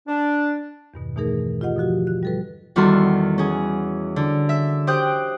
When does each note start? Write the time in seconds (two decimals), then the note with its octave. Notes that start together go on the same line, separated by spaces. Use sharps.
0.07 D4
0.94 E2 G2 B2 D#3
1.16 B2 E3 A3 D#4 G#4 A#4
1.60 D#3 F4 G4 D#5 F#5
1.76 B2 D3 F3 F#4 G4
2.07 F#6
2.23 G3 A4 B4
2.76 E2 D#3 G3 F#4 A4 C6
3.38 C#4 G#4
4.16 D3
4.49 E5
4.87 G4 C5 G5 D#6 F#6 G6